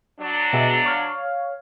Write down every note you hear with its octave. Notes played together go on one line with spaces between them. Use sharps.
F#3 D4
B2 G#3 E5
C#5 F5